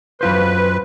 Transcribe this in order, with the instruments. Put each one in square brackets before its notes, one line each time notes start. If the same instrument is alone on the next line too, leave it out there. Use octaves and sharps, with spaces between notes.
[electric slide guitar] F#2 F4 C5 [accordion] B4